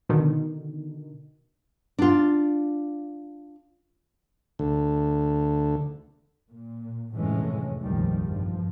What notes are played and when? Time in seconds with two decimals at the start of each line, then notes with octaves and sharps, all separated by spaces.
0.09 B2 D3 D#3
1.99 D4 F4
4.59 D2 D3
6.50 A#2
7.13 F1 F#2 A2 E3 G#3 C#4
7.84 F1 A#1 D#2 D#3 F3 G3
8.22 E2 G2 F3